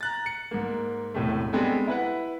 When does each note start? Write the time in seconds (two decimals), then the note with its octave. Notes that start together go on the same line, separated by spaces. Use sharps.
0.01 A#5 F#6 A6
0.26 C#7
0.51 G#2 A#3
1.14 E1 A2 C3 A3
1.53 G3 G#3 B3 C4 D4 A4
1.87 E4 B4 F#5